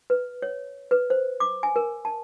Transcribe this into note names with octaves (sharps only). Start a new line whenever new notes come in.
B4
C#5
B4
C5
D6
G#5
A#4
A5